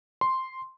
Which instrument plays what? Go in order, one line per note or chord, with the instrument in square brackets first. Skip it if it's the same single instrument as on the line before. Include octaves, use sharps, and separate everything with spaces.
[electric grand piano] C6